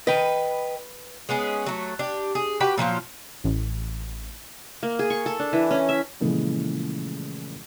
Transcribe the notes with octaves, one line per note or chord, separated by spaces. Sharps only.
B4 D#5 G5
G#3 B3 C#4 G#4
F#3 A3
D4 G4
G#4
F#4 G4 B4 G5
A#2 F3 F#3 F4
A1
A#3
G#4
C#6
A4
D4
E3
C#4
E5
A#2 C#3 E3 F3 G#3 A3